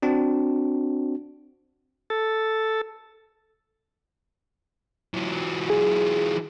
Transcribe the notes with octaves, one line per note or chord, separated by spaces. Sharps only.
C4 D4 F#4
A4
E3 F#3
G#4